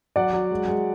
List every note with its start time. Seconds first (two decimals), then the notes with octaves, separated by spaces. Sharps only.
0.16 F#3 D5 F#5
0.33 F#3
0.51 G#3
0.68 G#3